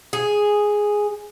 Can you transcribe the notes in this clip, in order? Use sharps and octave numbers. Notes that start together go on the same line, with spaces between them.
G#4